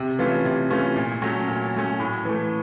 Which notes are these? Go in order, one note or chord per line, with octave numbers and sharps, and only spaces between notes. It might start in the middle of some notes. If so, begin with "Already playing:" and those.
Already playing: C3
E3 A3 C#4 F4
C3
E3 A3 C#4 F4
A#2
F#3 A3 C#4
A#2
F#3 A3 C#4
A2
E3 A3